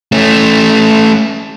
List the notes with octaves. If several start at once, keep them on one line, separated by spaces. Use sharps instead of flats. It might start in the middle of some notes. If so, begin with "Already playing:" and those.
A3 C#4